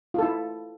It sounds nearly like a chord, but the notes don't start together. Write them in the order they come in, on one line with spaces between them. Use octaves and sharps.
F4 A4 E4